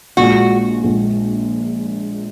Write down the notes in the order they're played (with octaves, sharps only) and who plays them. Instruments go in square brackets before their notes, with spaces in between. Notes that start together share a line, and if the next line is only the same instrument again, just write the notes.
[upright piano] A#1 A#2 G#3 [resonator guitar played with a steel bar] F#4
[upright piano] A#1 A#2 G#3